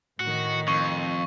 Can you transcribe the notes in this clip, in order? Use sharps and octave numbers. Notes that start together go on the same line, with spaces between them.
A2 D#3 F#4
F2 C#6